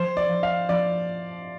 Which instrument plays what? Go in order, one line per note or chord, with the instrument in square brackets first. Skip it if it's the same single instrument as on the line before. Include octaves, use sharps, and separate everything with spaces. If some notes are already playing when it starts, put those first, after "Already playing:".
Already playing: [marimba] F3 [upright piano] C5
[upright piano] D5
[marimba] F3
[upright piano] F5
[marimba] F3 [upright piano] D5